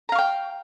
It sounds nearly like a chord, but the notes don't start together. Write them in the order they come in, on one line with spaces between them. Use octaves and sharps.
A#5 F5 C#6 G5